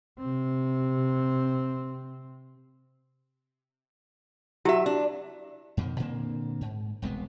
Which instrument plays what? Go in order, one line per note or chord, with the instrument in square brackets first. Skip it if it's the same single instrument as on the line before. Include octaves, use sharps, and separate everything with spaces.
[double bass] C3 C4
[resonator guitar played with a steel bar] F#3 E5 [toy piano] E4 F#4 G4
[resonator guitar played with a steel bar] D4
[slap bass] F2 B2 D3 D#3
A#2 D3 A#3 C4
G#2
E1 C2 G#3 B3